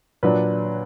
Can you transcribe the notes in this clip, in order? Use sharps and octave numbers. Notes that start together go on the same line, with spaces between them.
A#2 F#3 D4 B4